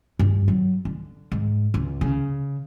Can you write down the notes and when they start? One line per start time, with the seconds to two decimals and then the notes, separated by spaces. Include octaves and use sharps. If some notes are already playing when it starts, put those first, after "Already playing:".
0.19 G2
0.48 F#3
0.85 D3
1.32 G#2
1.74 C#2
2.01 C#3